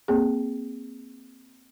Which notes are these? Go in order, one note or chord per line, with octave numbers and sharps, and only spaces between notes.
A#3 C4 G#4